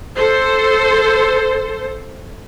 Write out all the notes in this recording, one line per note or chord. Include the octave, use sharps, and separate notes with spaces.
A4 C5